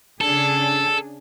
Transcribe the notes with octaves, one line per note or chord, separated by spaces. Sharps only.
C#3 D4 G#4 A4